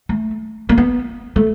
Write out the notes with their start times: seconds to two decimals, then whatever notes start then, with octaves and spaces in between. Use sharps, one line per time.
0.09 A3
0.69 A#3
0.78 B3
1.36 A3